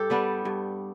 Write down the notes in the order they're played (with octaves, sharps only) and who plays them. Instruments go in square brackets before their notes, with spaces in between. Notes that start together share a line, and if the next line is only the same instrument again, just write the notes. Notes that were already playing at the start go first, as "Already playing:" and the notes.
Already playing: [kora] G2 G4 A4
G3 B3 D4
G2